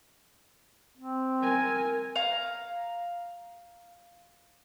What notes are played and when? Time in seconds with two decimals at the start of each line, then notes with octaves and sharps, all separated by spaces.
0.97 C4
1.40 A#4 G#5
2.16 F5 A#5